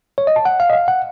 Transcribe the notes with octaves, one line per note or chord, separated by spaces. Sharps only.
C#5
D#5
A5
F#5
F5
D#5
F5
F#5